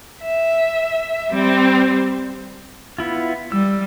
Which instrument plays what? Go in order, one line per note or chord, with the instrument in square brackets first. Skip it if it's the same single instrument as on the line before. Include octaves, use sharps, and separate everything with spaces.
[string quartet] E5
G3 C4
[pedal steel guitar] B3 E4 F4
[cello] G3 [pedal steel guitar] E6